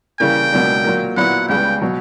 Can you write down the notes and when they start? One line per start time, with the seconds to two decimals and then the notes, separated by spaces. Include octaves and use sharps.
0.20 C#3 E3 G3 A#3 G5
0.52 C#2 B2 F#3 A#3 D4
0.84 A#2 F#3 A#3
1.17 A#2 F#3 B3 E4 F#5
1.49 C#2 C#3 G3 B3 G5
1.81 B2 F#3